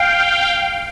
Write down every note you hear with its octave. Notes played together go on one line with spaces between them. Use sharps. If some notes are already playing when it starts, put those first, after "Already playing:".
Already playing: F5 G5